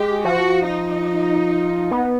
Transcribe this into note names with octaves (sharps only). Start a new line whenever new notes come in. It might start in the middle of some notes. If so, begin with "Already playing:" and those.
Already playing: G#3 G4
F3 F#4
D#4
B3